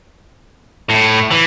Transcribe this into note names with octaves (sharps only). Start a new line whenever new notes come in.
A2
E3